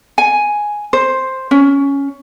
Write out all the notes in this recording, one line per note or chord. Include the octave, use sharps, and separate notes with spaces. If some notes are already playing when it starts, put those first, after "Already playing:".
G#5
C5
C#4